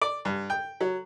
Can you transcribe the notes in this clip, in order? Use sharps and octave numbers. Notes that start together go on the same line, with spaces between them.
D5
G2
G5
F#3